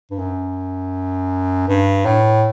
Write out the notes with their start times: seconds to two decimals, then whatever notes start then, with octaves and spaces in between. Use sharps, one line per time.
0.11 G2
0.18 F#2
1.68 G2
2.05 A2